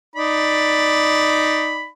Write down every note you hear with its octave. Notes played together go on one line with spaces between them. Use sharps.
D#4 D5 B5